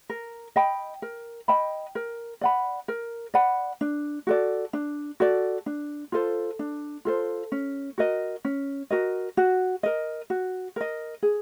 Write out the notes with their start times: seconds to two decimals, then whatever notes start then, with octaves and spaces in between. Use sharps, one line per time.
0.10 A#4
0.56 D#5 G5 B5
1.02 A#4
1.48 D#5 G5 B5
1.95 A#4
2.41 D5 F#5 B5
2.88 A#4
3.34 D5 F#5 B5
3.81 D4
4.27 F#4 A4 D5
4.73 D4
5.20 F#4 A4 D5
5.66 D4
6.12 F4 A4 C5
6.59 D4
7.05 F4 A4 C5
7.52 C#4
7.98 F#4 A#4 D#5
8.45 C#4
8.90 F#4 A#4 D#5
9.37 F#4
9.83 A#4 D#5
10.30 F#4
10.76 A#4 D#5
11.23 G#4